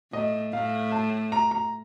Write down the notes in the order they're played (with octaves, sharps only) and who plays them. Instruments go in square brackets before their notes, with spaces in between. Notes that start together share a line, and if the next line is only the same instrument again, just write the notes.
[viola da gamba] A2 [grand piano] D#5
[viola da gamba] A2 [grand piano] F5
[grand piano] A5
A#5
A#5